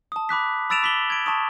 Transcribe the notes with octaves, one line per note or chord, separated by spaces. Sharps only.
A5 D#6
B5 D6 F#6 B6
B5 E6 A6 D7 E7 F7
D6 B6 F#7 G7
G#6 D7
A5 C#6 D#6